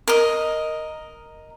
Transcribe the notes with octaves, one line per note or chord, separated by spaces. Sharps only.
A#4 D#5